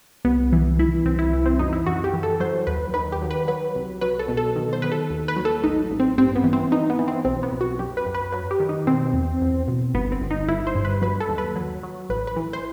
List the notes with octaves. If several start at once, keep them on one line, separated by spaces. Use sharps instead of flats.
C2 B3
E3
E3 E4
C2 C4
E4
E3
C4
F#2 D#4
E4
F#2 F#4
G4
E3
A4
F#3 C5
D#2 B4
D#3 B4
G4
F#3
B4
F#3 B4
C2
F#3 B4
A4
B2
A4
D#3
C5
D#3 B4
A4
D#2
B4
F#3
A4
A1 D#4
A1
C4
G2 C4
B3
E3
C4
E3 D#4
B3
E3
C4
B1 C4
B3
B1
F#4
F#2 G4
B4
F#2
B4
F#3 B4
G4
D#3
D#4
B2 C4
E2
E2
B2
G1 B3
C4
G1
D#4
G1 E4
C5
G2
B4
F#3 B4
A4
D#2
B4
F#3
F#3
A1 B4
B4
E3
C5